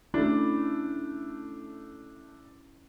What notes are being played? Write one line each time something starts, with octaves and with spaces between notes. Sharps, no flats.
A3 C#4 D4 E4